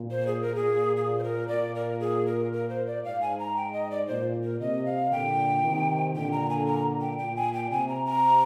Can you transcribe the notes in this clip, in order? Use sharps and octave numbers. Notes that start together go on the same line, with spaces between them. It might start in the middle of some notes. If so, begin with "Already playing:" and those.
Already playing: A#2
C5
G#4
A#2 A#4
G#4
G#4
C5
A#4
A#2 D5
A#4
G#4
A#4
A#4
C5
D5
G#2 F5
G#5
A#5
G5
D#5
D5
A#2 C5
A#4
C3 D#5
F5
A#2 D3 G5
C3 D#3
A#2 D3 G5
A#5
G#5
A#5
G5
A#2 G5
G#5
G5
C3 G#5
A#5
A#5